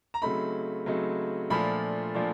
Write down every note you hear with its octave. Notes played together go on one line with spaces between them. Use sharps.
A#5
C#3 F#3 A3 C4 D#4 B5
C#3 F#3 A3 C4 D#4
A#2 F3 A3 D4 F4 B5
A#2 F3 A3 D4 F4